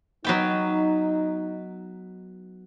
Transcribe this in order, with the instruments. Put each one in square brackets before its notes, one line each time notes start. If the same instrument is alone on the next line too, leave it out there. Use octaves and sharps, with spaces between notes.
[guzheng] F#3 B3 G5 [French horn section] D#4